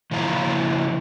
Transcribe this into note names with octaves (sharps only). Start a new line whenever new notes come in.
C#3 F3 E4 F5 A#5